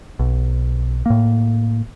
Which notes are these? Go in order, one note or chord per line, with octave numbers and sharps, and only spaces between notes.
B1
A2 A#3